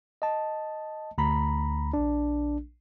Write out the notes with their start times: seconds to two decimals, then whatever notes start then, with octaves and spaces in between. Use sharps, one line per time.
0.22 D#5 A5
1.18 D2 A#5 B5
1.93 A#1 D4